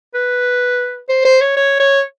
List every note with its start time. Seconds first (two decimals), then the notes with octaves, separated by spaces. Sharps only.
0.15 B4
1.09 C5
1.25 C5
1.41 C#5
1.56 C#5
1.80 C#5